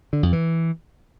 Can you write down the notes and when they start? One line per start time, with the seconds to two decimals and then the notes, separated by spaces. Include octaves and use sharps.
0.13 D3
0.23 F2
0.33 E3